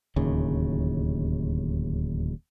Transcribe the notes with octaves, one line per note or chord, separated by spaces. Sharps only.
D1 D#2 C#3